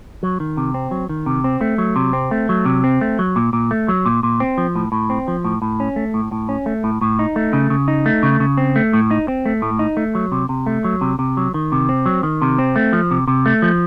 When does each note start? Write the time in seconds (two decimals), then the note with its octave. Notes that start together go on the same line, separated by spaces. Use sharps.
0.23 F#3
0.40 D#3
0.57 C3
0.74 C4
0.91 F#3
1.09 D#3
1.26 C3
1.44 C4
1.61 A3
1.78 F#3
1.96 C3
2.13 C4
2.31 A3
2.49 F#3
2.65 C3
2.84 C4
3.01 A3
3.19 F#3
3.36 A#2
3.53 A#2
3.71 A3
3.88 F#3
4.06 A#2
4.23 A#2
4.40 C4
4.58 F3
4.76 A2
4.92 A2
5.10 C4
5.28 F3
5.44 A2
5.62 A2
5.80 C#4
5.96 A3
6.14 A2
6.32 A2
6.49 C#4
6.66 A3
6.84 A2
7.01 A2
7.19 D#4
7.36 A3
7.53 C#3
7.70 C#3
7.88 D#4
8.06 A3
8.23 C#3
8.40 C#3
8.58 C4
8.76 A3
8.93 A2
9.11 D#4
9.28 C4
9.46 A3
9.62 A2
9.79 D#4
9.97 A3
10.15 F#3
10.32 C3
10.49 C3
10.66 A3
10.84 F#3
11.01 C3
11.19 C3
11.37 F#3
11.54 D#3
11.72 C3
11.89 C4
12.06 F#3
12.23 D#3
12.42 C3
12.59 C4
12.76 A3
12.93 F3
13.11 C3
13.28 C3
13.46 A3
13.62 F3